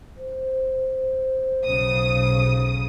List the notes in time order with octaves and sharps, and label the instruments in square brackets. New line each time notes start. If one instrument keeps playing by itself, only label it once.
[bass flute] C5
[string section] B1 C#3 D#6